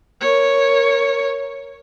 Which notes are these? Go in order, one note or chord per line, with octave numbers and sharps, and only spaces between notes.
A#4 C#5